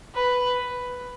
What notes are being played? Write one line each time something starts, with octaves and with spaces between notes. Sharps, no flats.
B4